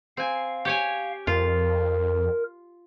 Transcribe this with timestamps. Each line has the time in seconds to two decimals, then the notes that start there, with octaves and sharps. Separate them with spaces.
0.17 C4 F5 G#5
0.65 G4 C#5 G#5
1.27 F2 F4 A#4